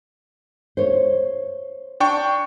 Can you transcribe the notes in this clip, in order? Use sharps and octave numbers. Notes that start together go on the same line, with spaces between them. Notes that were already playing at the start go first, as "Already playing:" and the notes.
C5 C#5
D4 G5 C#6